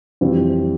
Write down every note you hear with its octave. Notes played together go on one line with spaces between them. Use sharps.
F2 E3 G3 C4